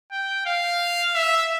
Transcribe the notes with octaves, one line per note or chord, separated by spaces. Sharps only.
G5
F5
E5